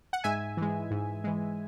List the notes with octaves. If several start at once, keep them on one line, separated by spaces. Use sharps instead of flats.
F#5
G#2 E5 G#5
E3 G#3
G#2
E3 G#3